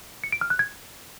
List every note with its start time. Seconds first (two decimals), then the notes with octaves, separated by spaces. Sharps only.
0.24 C#7
0.32 D7
0.41 F6
0.50 F#6
0.59 G#6